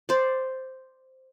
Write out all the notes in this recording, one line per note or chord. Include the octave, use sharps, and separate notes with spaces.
C5 D5